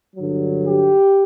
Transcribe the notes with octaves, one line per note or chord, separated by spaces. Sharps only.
G2 D3 F#3
G4